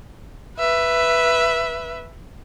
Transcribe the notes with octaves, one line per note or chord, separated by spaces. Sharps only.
B4 E5